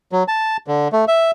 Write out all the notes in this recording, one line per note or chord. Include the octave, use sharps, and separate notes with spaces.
F#3
A5
D3
A3
E5